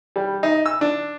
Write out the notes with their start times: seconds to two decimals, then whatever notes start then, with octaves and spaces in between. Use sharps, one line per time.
0.16 G3
0.43 D#4
0.66 E6
0.81 D4